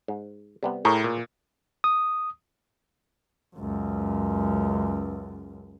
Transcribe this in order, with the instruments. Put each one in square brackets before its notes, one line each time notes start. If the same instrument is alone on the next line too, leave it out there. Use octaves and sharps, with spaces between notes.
[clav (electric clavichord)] G#2
C3 G3 B3
[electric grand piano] A2 A#5 [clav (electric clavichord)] G#4 A#4 C#5
[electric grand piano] A#2
[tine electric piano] D#6
[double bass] C#2 F#2